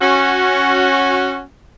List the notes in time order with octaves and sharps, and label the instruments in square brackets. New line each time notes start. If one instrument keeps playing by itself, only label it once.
[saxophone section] C#4 F#4